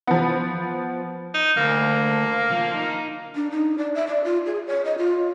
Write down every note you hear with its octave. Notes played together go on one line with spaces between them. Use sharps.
F3 B3
D#4
D2 A#3
F3
D#4
D4
D#4
D5
E5
D5
F4
G#4
C#5
D#5
F4